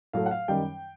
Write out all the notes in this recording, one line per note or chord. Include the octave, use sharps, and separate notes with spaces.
A2 F#3 A3 F5
F#5
F5
F#2 D#3 G3 G5